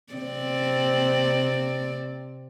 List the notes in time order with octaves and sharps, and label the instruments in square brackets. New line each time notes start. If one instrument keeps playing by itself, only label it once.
[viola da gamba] C3 C4 D5